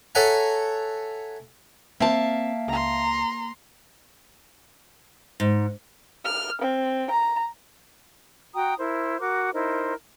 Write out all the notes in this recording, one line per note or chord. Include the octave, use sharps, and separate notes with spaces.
A4 C#5 E5 F#5 G#5 A#5
A#3 C4 E5 F5 A5
C#2 A#5 C6
G#2
F6
C4
A#5
F#4 G5 A#5 D#6
E4 A#4 C5
F#4 A#4 D6
D#4 E4 A#4 C5